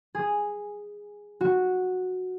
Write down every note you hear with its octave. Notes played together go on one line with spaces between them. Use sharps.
G#4
F#4